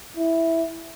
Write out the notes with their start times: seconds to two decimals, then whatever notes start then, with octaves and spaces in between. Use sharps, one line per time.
0.17 E4